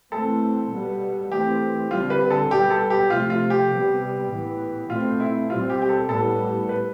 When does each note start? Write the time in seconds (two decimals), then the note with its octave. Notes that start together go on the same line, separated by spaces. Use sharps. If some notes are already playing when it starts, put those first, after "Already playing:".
0.12 E3 A3 C4 A4
0.71 B2 G3 B3
1.31 E3 A3 C4 G4
1.90 D3 G3 C4 F4
2.10 B4
2.31 A4
2.51 B2 G3 B3 G4
2.70 A4
2.90 G4
3.10 C3 F3 A3 F4
3.30 F4
3.50 G4
3.70 C3 G3 B3
4.30 A2 E3 B3
4.89 B2 A3 C4 F4
5.20 E4
5.49 B2 G3 C4 F4
5.70 G4
5.82 G4
5.89 A4
6.09 A2 G3 B3 A4
6.69 B4